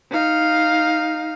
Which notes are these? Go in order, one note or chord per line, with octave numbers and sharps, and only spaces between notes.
D#4 F5